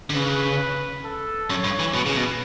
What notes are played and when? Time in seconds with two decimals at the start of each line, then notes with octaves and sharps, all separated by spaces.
0.10 D3
0.15 C#3 B4
1.05 A4
1.50 F#2 C#5
1.64 G2
1.79 E3
1.94 B2 B4
2.06 C#3
2.16 B2